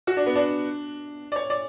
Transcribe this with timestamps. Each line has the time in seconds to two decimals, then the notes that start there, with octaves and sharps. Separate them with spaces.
0.07 F#4
0.17 D4
0.26 B3
0.36 D4
1.32 D5
1.36 C#5
1.50 D5